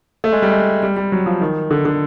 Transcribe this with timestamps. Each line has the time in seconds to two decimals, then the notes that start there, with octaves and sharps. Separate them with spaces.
0.24 A3
0.32 G#3
0.42 G3
0.52 G#3
0.83 G3
0.96 G3
1.12 F#3
1.26 F3
1.41 D#3
1.71 D3
1.85 D3